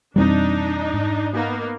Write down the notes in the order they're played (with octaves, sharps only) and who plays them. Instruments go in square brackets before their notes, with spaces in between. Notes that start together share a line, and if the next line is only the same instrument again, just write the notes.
[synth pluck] F2 B2 E3 [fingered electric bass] G3 B3 C4 [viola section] D4 D#4
[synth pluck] G#2
[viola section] A#3 B3 D#4